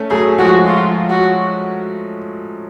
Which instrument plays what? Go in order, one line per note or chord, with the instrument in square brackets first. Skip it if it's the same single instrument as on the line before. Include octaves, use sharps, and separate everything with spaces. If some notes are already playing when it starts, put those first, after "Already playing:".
Already playing: [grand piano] A3 C#4
[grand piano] F#3 A3 [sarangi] G#4
[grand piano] F3 G#3 [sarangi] F#4
[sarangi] F4
F#4